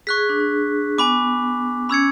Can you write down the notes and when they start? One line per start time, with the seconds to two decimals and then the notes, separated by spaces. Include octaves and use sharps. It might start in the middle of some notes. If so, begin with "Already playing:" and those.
0.07 G#4 C#6 F#6 B6
0.17 G#4
0.29 D4
0.40 D4
0.98 B3 G#5 B5 D6
1.89 C#4 B5 E6 G#6 C#7